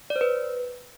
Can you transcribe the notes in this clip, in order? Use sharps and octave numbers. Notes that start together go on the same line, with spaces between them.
D5
C5
B4